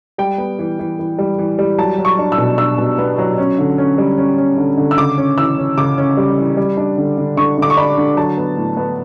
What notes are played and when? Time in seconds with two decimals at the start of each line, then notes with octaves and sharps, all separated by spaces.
0.18 G3 G5
0.38 B3
0.59 E3
0.79 E3
0.99 E3
1.19 G3
1.39 E3
1.59 G3
1.78 F#3 A5
1.98 F#3
2.05 C#6
2.19 D4
2.32 E6
2.38 B2
2.58 D4 E6
2.78 B2
2.98 B3
3.18 F#3
3.38 C#4
3.58 D3
3.78 C#4
3.98 G3
4.18 C#4
4.38 C#4
4.58 D3
4.77 D3
4.91 E6
4.98 C#3 D6
5.18 C#4
5.38 E3 E6
5.58 C#4
5.78 C#3 D6
5.98 C#4
6.17 G3
6.38 E3
6.57 G3
6.77 D4
6.98 D3
7.18 D3
7.37 D3 C#6
7.58 D3 D6
7.70 C#6
7.77 D4 B5
7.98 D3
8.17 F#3 A5
8.37 B3
8.57 A2
8.77 B3